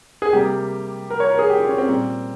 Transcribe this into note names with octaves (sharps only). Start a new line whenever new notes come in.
G#4
C3 G3 A#3 G4
A#4
C#5
A#4
G#4
G4
F4
C#4
C4
A#2 G3 A#3